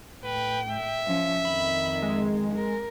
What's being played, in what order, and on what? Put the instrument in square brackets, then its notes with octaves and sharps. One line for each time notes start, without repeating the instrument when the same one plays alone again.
[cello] A2 G5 [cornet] B4
[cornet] E5
[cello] F3 C#4
[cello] F2 D#3 [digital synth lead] B5
[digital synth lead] G#3
[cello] A#4